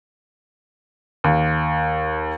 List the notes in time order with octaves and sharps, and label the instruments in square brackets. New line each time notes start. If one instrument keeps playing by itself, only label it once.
[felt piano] D#2